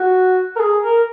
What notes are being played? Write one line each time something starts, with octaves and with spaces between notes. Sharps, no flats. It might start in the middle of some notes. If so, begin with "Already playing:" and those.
Already playing: F#4
A#4
G#4
A#4